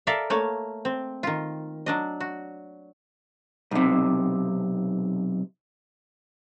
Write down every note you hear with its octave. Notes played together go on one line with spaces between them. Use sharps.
A4 A#4 D5 E5 F5
A3 A#3 C#5
C4
D#3 F4
F#3 D4 D#5
F#4
B1 C3